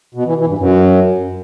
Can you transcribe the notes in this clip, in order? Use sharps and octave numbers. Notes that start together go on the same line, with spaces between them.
B2
E3
E3
G2
F#2